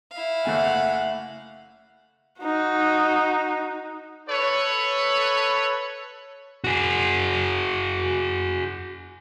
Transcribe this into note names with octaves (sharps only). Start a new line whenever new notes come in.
E4 F5
F#1 A3 F#5 G#5
D#4 F#4
A4 B4 C#5
F#4 G#4